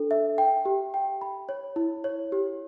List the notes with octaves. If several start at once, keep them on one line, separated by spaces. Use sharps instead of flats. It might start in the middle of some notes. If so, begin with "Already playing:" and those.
Already playing: D4 A4
E5
G5
G4
G5
B5
C#5
E4
C#5
G4